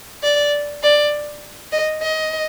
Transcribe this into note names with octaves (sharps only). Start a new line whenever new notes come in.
D5
D5
D#5
D#5